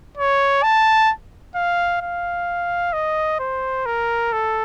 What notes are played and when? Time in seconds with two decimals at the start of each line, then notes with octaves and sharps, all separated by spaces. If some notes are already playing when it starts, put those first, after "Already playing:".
0.17 C#5
0.63 A5
1.55 F5
2.02 F5
2.93 D#5
3.40 C5
3.86 A#4
4.32 A4